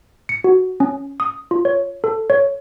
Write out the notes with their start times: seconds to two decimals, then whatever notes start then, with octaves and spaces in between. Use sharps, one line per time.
0.29 C#7
0.44 F#4
0.80 C#4
1.20 D#6
1.51 F4
1.65 C#5
2.04 A4
2.30 C#5